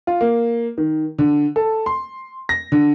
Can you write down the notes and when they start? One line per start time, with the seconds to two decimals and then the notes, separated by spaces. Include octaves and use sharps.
0.07 F4
0.21 A#3
0.78 D#3
1.19 D3
1.56 A4
1.86 C6
2.49 A#6
2.72 D3